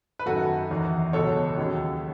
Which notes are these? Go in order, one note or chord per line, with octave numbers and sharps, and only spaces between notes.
B4
F#2 D#3 F#3 F#4 A4
E2 D#3 F#3
C#2 B2 F#3 A4 C#5
D#2 C#3 F#3